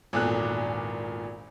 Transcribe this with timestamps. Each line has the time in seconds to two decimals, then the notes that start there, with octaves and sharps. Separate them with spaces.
0.13 G#1 E2 A#2 A4 F#6